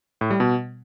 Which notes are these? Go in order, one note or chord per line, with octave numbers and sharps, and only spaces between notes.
A2
G3
B2